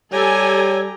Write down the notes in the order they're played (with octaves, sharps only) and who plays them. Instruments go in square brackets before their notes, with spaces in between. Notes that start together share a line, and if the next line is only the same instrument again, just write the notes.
[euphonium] G3 [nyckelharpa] G4 A#5 [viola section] A4 G#5 [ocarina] C#5